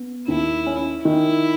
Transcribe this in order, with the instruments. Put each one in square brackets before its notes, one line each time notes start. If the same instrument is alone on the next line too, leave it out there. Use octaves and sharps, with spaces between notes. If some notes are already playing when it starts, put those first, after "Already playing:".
Already playing: [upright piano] B3
[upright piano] D#2 [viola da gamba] E4
[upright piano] C#4
[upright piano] D#3 [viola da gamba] E4